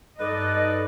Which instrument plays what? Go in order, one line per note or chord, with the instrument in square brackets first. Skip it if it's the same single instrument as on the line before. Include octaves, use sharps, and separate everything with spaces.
[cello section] G2 D#4 D#5 [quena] A4 [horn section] B4 D5